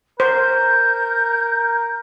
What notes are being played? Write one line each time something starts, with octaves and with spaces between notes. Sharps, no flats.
A#4 C5 G6